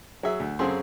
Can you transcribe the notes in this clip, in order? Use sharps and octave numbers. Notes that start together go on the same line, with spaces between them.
F#3 G#4 E5
D2
F#2 C#3 C4 G#4 A4 C6